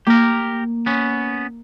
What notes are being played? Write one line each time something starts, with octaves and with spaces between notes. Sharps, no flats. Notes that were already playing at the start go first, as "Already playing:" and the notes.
A#3 G4 A#4
B3 C#4